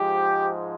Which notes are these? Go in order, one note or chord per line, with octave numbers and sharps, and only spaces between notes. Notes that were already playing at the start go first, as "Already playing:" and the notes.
Already playing: G#2 F3 G#3 G4